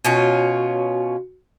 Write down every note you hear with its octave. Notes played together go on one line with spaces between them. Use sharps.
B2 C#4 F4 F#4